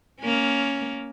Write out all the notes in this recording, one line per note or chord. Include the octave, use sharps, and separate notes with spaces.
A#3 C#4